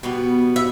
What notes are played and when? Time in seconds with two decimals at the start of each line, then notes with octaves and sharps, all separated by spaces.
0.03 B2 G3 B3
0.56 E5